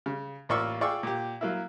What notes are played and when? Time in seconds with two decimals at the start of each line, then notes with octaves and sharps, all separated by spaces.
0.06 C#3
0.49 A1 A#3 F4 D5 C#6 E6
0.81 F4 G#4 D5 G5 C#6 E6
1.03 A#2 G4
1.41 F#3 A#3 E4